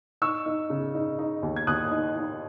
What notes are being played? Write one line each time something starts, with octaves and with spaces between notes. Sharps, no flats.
D#4 C#6 E6
D#4
C#3
D#4
D#4
D#2
G#6
D#2 D#6 F#6
D#4
D#4